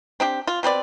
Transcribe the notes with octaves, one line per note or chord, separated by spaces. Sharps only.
C4 D4 G4
F4
B2 C4 B4 D5